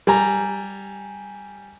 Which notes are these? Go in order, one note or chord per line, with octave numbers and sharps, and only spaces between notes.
G3 G#5 A#5